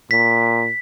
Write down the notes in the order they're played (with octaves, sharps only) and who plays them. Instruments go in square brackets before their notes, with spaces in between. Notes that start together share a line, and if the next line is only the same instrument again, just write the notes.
[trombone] A#2 [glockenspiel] B6